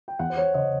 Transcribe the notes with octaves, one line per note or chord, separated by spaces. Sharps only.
G5
E2 F#5
C5
C#5
C#3 D#5